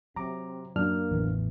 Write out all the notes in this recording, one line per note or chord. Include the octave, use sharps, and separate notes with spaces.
C3 F#3 C4 A#5 D6
F#2 A#3 D4 F6
A1 E2 E3